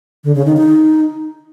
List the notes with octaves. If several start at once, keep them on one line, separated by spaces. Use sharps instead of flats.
D3
C#3
D#3
D#4